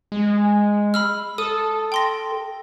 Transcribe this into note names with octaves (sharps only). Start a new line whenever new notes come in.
G#3
B5 E6 F6
A4 D#6 D#7
G5 C6 A#6